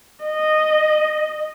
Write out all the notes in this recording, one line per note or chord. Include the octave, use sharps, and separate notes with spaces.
D#5